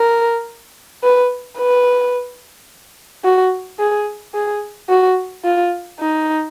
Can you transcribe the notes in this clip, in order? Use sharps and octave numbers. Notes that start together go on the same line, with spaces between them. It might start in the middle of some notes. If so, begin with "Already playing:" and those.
Already playing: A#4
B4
B4
F#4
G#4
G#4
F#4
F4
D#4